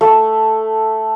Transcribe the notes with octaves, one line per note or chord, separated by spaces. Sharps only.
A3